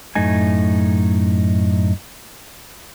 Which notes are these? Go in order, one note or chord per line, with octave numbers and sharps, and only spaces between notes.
F#2 A2 A3 D#4 G#5